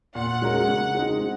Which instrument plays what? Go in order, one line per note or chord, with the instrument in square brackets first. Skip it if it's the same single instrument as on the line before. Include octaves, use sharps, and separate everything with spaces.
[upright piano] A#2 [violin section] F#5
[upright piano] G#3 C#4 F#4 A#4
C#3
G#3 C4 D#4
C#3